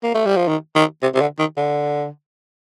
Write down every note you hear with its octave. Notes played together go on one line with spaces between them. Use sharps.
A#3
A3
G3
F3
D#3
D#3
C3
C3
D3
D#3
D3